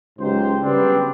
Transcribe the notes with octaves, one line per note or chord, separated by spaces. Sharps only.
C#2 G#2 F#3 G4 C5
C#3 F#3 G3 B3 C4 D4